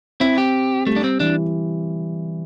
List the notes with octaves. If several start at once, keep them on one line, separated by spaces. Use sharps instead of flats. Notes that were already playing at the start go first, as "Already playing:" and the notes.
C4 E4
G4
G3 A3
D4
C4
E3 D4